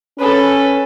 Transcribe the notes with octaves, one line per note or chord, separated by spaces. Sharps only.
C#4 A4 B4